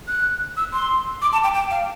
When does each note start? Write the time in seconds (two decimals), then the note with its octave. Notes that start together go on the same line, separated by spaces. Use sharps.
0.08 F#6
0.57 E6
0.73 C6
1.22 D6
1.33 A5
1.43 G5
1.54 G5
1.71 F5